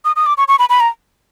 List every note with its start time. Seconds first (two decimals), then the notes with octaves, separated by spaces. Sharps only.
0.05 D#6
0.16 D#6
0.26 D6
0.38 C#6
0.48 C#6
0.59 B5
0.70 B5
0.80 A#5